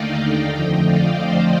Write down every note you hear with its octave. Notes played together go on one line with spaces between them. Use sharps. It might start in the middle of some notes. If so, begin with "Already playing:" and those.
Already playing: D#2 D3 A3 D#4 D5 D#5 F5 G5
D#5 G5
F2 D3 F3 A3
D5 F5
C5 D#5